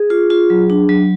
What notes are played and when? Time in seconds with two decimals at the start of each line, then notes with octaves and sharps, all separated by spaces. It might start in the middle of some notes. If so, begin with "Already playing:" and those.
Already playing: G#4
0.10 F4
0.30 F4
0.50 F#3
0.70 D4
0.89 F#3